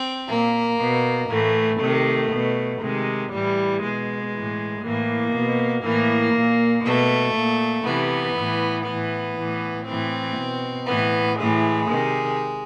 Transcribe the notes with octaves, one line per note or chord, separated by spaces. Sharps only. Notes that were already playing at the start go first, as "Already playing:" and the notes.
Already playing: C4
A#2 A#3
B2
A2 E3 A3
C3 D#3 A3
B2
C3 D#3 G#3
A2 E3 G3
B2 G#3
A2 E3
A2 E3 A#3
B2
A2 E3 A#3
A#2
B2 A3
A#2
C3 E3 B3
A2 E3
A2 E3 B3
A2 E3
A2 E3 C4
B2
A2 E3 B3
A2 E3 G#3
C3 D#3